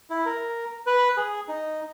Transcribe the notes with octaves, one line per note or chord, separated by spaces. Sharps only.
E4
A#4
B4
G#4
D#4